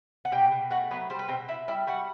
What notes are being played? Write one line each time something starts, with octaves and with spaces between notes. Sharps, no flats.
F#5
B2 G4 G5
B2
A3 F#4 F#5
F#3 B3 B4
G3 C5
B4
B2 C4 C5
B2 E4 E5
G3 E4 E5
G3 F#4 F#5